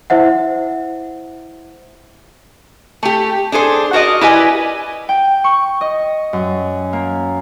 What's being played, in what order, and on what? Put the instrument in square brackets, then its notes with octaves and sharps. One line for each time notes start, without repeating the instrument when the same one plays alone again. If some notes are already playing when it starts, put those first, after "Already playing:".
[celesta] E4 C5 E5 F#5
[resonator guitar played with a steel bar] A3 G4
D4 G#4 A4 C5
F#4 A#4 D5 D#5
E4 G4 B4 D5 D#5 G#5
[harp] G5
C#6
D#5
F#2
A#3